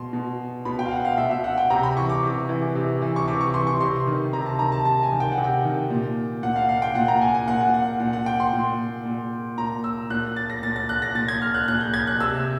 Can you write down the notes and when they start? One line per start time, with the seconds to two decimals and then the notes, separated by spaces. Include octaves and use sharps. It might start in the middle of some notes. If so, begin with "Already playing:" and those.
Already playing: B2 C6
0.13 B2
0.65 B2 B5
0.79 G5
0.85 F5
0.91 F#5
1.05 F5
1.18 B2 E5
1.31 E5
1.44 F#5
1.58 G5
1.70 C3 A#5
1.83 B5
1.97 E3 C#6
2.09 D6
2.23 C3
2.49 E3
2.75 C3
3.02 E3
3.16 C#6
3.28 C3 D6
3.41 C#6
3.54 E3 C6
3.67 C#6
3.80 C3 C6
4.07 D#3
4.33 C3 A#5
4.46 A5
4.59 D#3 A#5
4.72 A5
4.85 C3 A5
5.03 G#5
5.12 D#3
5.20 G5
5.32 F#5
5.38 C3
5.44 G5
5.64 D#3
5.90 A#2
6.43 A#2 F#5
6.56 F5
6.69 F5
6.82 G5
6.95 A#2 F#5
7.08 A#5
7.21 G#5
7.34 G#5
7.48 A#2 F#5
7.61 F#5
7.74 F#5
8.00 A#2 F#5
8.13 F#5
8.26 G5
8.40 C6
8.53 A#2
9.05 A#2
9.58 A#2 A#5
9.84 E6
10.10 A#2 F#6
10.36 A6
10.50 A#6
10.63 A#2 A6
10.76 A6
10.89 F#6
11.02 A#6
11.15 A#2 A6
11.28 G#6
11.42 F6
11.54 F#6
11.68 A#2 F#6
11.81 G6
11.94 G#6
12.07 F#6
12.20 C3 E6